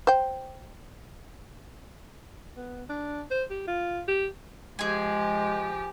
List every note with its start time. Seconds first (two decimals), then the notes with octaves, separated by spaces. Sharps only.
0.07 C5 G5
2.57 B3
2.89 D4
3.31 C5
3.50 G4
3.67 F4
4.08 G4
4.79 F3 G#3 G4 G#4 G#5